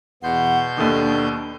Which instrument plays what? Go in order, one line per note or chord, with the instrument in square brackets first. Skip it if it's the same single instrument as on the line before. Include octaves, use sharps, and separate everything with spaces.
[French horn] E2 [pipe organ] B2 C6 G6 [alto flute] F#5
[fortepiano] D#2 D#3 [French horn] D4 [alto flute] A4